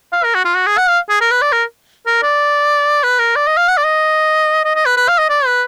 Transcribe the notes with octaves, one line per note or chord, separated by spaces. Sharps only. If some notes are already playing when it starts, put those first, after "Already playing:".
F5
A#4
F#4
F4
F#4
G#4
F#5
F5
G#4
A#4
B4
D5
A#4
A#4
D5
B4
A#4
D5
D#5
F5
F#5
D5
D#5
D#5
D#5
B4
B4
F5
D#5
D5
B4